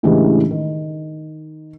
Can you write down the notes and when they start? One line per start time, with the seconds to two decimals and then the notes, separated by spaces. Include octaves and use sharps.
0.03 A2 C#3 E3 G#3 D4 G4
0.51 D#3